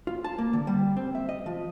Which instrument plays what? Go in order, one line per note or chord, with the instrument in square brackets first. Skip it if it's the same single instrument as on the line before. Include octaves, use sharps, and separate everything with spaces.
[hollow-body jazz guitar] F4
A5
A#3
D3
G3
C4
E5
D#5
F3